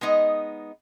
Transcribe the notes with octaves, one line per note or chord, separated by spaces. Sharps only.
G#3 B3 D#4 D#5